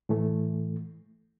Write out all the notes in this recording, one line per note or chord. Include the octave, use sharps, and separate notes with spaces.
A2 E3 A3